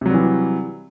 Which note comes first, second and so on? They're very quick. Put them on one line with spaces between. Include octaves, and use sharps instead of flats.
C3 F#3 G3 E3